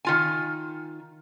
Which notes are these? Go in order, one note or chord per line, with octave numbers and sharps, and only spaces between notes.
D#3 F4 G#5